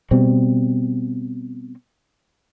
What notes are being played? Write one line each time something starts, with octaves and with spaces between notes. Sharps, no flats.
B2 G3 C4